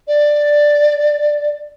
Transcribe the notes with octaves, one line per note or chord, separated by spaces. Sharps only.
D5